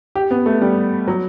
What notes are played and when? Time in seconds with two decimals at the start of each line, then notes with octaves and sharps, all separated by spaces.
0.15 G4
0.31 B3
0.46 A3
0.61 G3
1.08 F#3